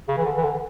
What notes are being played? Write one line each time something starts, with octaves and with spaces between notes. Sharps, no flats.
C#3
E3
D3
E3
D3